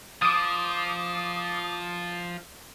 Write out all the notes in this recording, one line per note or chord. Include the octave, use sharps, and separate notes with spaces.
F3 D6 D#6